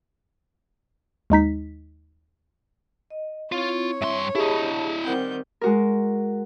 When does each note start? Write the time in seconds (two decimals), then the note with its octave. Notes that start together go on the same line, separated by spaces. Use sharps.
1.30 D#2 G#3 D#4 B6
3.10 D#5
3.52 C4 E4 F4 C#5
4.02 G2 E5 C6
4.35 E4 G4 G#4 D#5 A5 B5
5.05 D#3 G3 C4 A#4 C5 F#5 G5 G6
5.61 G#3 F#4 A#4